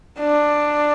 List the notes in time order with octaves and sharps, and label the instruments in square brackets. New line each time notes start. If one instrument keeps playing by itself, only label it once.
[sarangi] D4